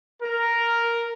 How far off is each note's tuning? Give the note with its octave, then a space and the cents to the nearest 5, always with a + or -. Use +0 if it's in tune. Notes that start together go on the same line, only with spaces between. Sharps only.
A#4 +0